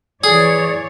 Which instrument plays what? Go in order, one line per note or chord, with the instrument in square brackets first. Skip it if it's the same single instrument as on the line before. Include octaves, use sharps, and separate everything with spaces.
[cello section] E3 C#5 D5 [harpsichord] G#4